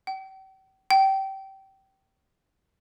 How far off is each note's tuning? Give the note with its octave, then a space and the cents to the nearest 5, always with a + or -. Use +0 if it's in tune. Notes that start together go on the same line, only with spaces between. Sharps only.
G5 -40
G5 -20